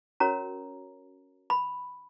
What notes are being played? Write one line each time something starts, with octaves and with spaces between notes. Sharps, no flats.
C#4 F#4 A#4 C#5 A#5
B5